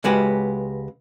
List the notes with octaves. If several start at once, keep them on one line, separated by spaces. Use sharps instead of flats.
C#2 G#3 F#4 G4 B4